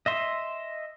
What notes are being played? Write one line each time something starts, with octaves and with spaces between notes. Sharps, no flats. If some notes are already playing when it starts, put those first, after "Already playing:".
D#5 E5 C6